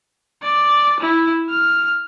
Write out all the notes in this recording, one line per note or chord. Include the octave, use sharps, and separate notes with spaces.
D5
E4
F6